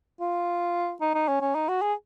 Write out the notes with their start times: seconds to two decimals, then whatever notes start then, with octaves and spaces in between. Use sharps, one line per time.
0.21 F4
1.01 D#4
1.15 D#4
1.28 C#4
1.41 C#4
1.55 D#4
1.69 F#4
1.82 G#4